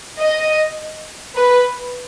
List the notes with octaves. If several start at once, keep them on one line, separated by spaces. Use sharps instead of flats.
D#5
B4